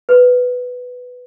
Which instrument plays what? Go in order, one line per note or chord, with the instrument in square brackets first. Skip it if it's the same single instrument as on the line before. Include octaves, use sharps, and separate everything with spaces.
[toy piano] B4